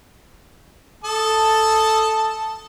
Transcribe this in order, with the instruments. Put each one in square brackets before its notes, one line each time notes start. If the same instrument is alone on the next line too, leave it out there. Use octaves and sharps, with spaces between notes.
[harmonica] A4 A5 D#6